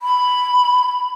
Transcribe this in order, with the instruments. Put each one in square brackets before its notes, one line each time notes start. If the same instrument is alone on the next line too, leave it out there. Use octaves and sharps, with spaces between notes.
[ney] B5